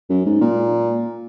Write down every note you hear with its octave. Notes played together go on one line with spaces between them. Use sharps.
F#2
G#2
A#2